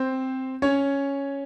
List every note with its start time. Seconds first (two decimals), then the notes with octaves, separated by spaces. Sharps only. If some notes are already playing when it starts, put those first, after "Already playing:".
Already playing: C4 C5
0.62 C#4 C#5